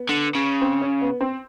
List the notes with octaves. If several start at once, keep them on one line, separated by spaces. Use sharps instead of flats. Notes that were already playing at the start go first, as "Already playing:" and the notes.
Already playing: B3
D3
C#3
C4
C#4
B3
C4